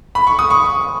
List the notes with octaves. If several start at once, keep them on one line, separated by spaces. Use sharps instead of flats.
B5
C#6
D#6
C#6